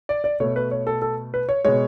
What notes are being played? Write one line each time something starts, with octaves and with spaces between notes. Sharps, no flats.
D5
D5
B2 A3 C#5
B4
C#5
A4
A4
B4
C#5
B2 G#3 C#5